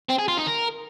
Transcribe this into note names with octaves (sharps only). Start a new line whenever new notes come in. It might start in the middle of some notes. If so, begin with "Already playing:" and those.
C4
G#4
F4
D#4
A#4